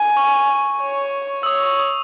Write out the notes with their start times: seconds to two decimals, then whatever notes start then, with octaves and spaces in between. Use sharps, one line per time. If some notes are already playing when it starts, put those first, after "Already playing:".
Already playing: G#5
0.17 C#6
0.82 C#5
1.43 E6
1.46 C#5 D#6
1.63 C#6
1.80 D#6